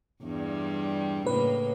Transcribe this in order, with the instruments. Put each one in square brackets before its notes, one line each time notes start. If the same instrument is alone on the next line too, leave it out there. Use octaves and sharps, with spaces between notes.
[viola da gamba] E2 G2 G3
[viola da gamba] A2 C#3 A#3 [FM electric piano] B4